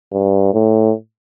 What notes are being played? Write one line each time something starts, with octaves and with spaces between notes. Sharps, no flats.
G2
A2